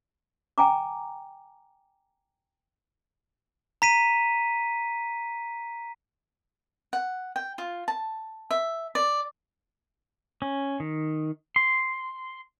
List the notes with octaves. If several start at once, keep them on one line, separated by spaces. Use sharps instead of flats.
G5 G#5 A#5 D6
A#5 B6 D#7
F#5
G5
F4
A5
E5
D5
C#4
D#3
C6